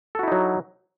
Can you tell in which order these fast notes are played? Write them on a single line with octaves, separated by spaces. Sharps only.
A4 F#4 E4 D#4 F#3